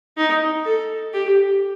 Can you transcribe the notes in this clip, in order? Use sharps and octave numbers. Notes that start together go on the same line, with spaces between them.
D#4
A4
G4